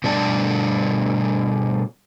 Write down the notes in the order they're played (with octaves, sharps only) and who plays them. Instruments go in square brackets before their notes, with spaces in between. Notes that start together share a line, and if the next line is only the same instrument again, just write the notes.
[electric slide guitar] B2 G3 A3 D4 D5 A5